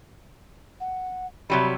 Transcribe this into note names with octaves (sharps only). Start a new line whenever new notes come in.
F#5
C3 F#3 G3 B5